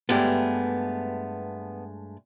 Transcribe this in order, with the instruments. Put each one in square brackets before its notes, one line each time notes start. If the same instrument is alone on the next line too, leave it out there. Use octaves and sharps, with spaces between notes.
[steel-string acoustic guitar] G2 G#3 A3 [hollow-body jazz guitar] B3 G4